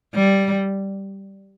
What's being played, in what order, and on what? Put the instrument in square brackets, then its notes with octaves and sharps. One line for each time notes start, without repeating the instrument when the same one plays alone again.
[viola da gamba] G3